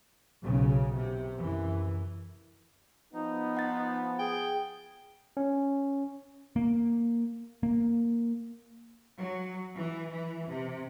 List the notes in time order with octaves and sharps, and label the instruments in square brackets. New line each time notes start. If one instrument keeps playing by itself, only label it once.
[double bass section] B1 C#3
C3
F#2 E3
[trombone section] F3 B3 [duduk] D#4
[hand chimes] F#5 A6
[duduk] G#4 [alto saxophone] G5
[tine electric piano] C#4
[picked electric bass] A#3
A#3
[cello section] F#3
E3
E3
C3